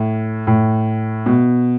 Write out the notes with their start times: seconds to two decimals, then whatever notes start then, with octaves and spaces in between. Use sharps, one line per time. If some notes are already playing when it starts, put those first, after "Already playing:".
Already playing: A2
0.47 A2
1.26 B2